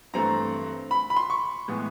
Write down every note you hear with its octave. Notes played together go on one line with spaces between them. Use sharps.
G2 E3 A3 C4 A#5
B5
B5
C6
C#6
A2 E3 G#3 B3